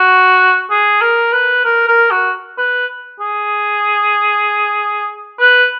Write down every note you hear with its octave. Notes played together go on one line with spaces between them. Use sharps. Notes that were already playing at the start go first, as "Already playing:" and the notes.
Already playing: F#4
G#4
A#4
B4
A#4
A#4
F#4
B4
G#4
B4